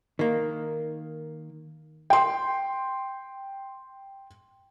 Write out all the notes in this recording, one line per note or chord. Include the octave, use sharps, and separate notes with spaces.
D#3 A#3
G5 C6